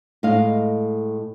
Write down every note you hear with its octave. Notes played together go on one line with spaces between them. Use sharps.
A2 G#3 D#5 F5